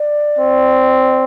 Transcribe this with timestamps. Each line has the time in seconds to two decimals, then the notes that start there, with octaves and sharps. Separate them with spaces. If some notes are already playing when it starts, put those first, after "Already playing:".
Already playing: D5
0.38 C4